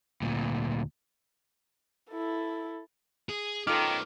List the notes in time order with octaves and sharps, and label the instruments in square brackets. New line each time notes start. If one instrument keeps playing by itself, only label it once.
[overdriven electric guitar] D2 A#2
[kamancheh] E4 A4
[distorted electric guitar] G#4
[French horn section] D#3 [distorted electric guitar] B3 C#4 [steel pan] D#4 F4 A4 [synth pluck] D6 F6